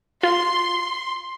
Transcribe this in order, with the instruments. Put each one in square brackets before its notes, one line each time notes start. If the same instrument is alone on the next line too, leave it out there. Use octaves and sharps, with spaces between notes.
[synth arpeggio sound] F4 [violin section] C6